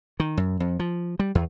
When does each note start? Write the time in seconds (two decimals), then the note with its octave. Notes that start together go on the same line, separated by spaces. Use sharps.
0.20 D#3
0.37 F#2
0.60 F2
0.79 F3
1.19 G3
1.35 E2